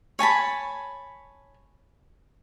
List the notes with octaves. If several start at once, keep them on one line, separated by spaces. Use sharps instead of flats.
C#5 G#5 A5 B5